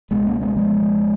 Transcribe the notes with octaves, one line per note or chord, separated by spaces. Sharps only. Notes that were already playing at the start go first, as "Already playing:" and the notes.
C#2 B2 G#3 B3
A#3 C#4
G#3 B3
F3 G#3